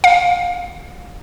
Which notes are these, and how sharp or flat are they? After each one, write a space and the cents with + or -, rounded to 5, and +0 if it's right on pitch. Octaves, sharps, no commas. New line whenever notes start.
F5 +25